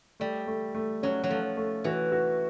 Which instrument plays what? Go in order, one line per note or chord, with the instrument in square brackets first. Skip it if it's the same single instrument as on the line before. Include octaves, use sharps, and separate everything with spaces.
[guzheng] G3 [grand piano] A3
[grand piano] A3
A3
[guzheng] F#3 [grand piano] C#4
[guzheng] F#3
[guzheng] F3 [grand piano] A3
[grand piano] A3
[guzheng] E3 [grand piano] F#4
[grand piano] F#4